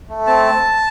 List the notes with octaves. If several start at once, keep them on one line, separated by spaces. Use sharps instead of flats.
A3
C4 A5